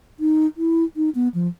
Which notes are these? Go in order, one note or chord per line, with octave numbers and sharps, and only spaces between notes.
D#4
E4
D#4
B3
F3